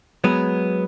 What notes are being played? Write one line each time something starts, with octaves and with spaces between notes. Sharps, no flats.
F#3 G#3 B3